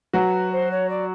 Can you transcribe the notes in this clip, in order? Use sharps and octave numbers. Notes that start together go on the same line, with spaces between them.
F#3 F#4 B4
C5
C#5
D5